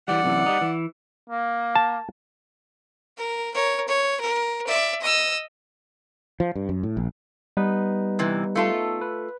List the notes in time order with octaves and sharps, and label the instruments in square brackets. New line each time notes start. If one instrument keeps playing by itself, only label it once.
[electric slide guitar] E3 G3 [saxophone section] D5 F#5
[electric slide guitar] F#2 C3 E3
G3 D#4
E3
[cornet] A#3
[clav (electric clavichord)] A5
[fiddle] A#4
A#4 C#5
C#5
A#4
D5 E5
D#5 E6
[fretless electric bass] F3
G2
F#2
A2
A#1
[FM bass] G3 [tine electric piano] B3 D#4 B4
[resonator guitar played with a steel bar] C3 E3
A3 F4 A4
[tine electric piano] B4